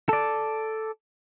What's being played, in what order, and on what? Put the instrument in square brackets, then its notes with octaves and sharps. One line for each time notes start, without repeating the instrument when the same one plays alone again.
[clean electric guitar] A4 D5